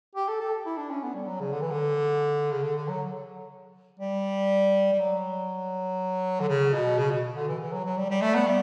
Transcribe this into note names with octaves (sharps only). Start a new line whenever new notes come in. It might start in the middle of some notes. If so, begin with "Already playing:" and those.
G4
A4
A4
E4
D4
C#4
B3
G3
F#3
C#3
D3
E3
D3
C#3
D3
D3
F#3
G3
G3
F#3
D3
C#3
B2
C#3
B2
D3
E3
E3
F#3
F#3
G3
G3
A3
B3
G3